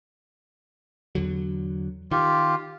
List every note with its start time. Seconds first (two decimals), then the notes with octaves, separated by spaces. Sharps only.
1.15 E2 D3 F#3
2.11 D#3 F4 G4